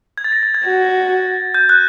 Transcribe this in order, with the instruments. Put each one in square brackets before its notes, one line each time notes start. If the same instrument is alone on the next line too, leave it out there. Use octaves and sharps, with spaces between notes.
[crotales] G#6
A6
A#6
A6
G#6
[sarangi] F#4
[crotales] G6
F#6